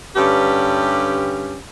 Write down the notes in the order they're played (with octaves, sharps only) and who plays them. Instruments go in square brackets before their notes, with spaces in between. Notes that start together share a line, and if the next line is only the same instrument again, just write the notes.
[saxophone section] G2 D3 C#4 G4 B4